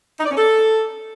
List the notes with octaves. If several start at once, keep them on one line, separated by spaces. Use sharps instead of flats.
D#4
D5
C#4
A4